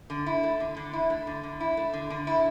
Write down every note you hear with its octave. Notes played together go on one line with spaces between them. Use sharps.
D3
E4
A3
D3
D3
E4
A3
D3
D3
E4
A3
D3
D3
E4